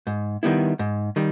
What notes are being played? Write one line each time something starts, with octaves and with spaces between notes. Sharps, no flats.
G#2
D#3 G3 B3 E4
G#2
D#3 G3